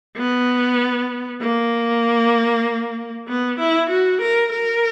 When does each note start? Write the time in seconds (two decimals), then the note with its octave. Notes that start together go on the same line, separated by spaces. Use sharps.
0.17 B3
1.42 A#3
3.28 B3
3.59 E4
3.90 F#4
4.21 A#4
4.52 A#4